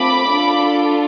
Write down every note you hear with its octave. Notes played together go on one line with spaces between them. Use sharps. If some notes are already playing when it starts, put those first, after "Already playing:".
Already playing: A3 C4 F4 A4 B5 D6
D4 F4 A4